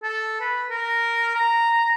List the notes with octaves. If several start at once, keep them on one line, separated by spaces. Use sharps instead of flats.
A4
B4
A#4
A#5